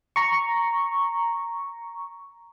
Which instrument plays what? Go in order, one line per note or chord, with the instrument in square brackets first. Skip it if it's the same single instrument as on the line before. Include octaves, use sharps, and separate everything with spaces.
[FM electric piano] A#5 C#6